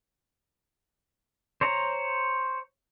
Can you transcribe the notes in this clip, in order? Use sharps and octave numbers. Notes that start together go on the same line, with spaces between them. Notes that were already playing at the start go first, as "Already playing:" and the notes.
C5 C#5 A#5